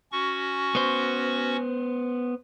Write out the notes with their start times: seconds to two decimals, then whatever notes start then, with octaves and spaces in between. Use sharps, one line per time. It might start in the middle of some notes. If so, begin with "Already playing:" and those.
0.12 C#4 F#4 C#6
0.75 B3 C5